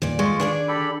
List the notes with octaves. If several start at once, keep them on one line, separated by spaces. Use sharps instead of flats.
E2 G2 A#2 D#3 D5
G#3 F4 C#6
D#3 D4 G#4 D5
G4 A4 B5